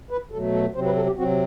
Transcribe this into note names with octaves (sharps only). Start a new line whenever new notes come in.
B4
B2 F#3 A3 A4
A4
C3 F#3 C4 C5
B4
A4
G4
C3 F#3 C4 F#4